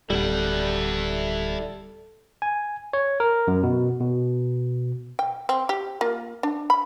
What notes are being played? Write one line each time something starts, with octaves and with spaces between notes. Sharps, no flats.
D1 G3 E4 A4 F#5
G#5
C#5
A#4
F#2
B2
B2
G5
C4
G4
A#3 F4
D4
B5